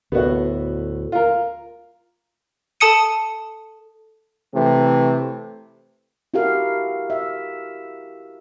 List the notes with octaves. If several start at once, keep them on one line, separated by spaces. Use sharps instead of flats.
D2 A2 B3 F#4
F4 A#4
A4 A5 D#6 C#7 D#7
C3 E3 A3
E4 F#4 G4 A4 A#4 F5
E5